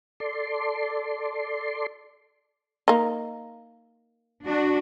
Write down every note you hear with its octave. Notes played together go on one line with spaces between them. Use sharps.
A4 D5 C6
A#3 D#4
D4 F#4